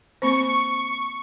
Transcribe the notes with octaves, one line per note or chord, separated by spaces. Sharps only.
A#3 C4 C5 C#6